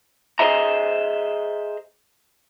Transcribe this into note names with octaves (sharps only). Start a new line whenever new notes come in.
G#4 C5 D#5 E5 A#5